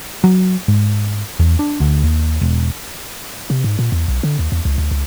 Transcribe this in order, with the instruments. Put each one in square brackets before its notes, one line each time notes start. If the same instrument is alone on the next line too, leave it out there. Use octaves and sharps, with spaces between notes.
[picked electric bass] F#3
G#2
E2
D4
D2
D#2
E1
[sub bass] C3
G#2
A#2
E2
B1
D3
D#2
E2
C#2
D2
C#2